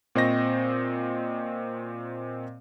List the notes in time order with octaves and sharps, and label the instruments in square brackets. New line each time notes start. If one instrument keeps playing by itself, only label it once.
[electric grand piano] A#2 C4 C5 D#5 C#6 A#6